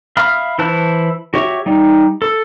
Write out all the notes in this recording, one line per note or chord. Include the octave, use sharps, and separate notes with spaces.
E5 F5 B5 D#6 F6
E3 E4 C5 A5 F#6
F#4 G4 C#5 E5
G3 D#4
A4